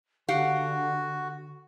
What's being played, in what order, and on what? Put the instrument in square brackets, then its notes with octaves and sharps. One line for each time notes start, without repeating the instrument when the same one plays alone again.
[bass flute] D3 [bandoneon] F#4 [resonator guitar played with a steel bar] G4 F5 F#5